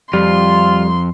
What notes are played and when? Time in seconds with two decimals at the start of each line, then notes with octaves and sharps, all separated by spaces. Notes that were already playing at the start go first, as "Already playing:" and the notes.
0.13 F2 G3 F4 C6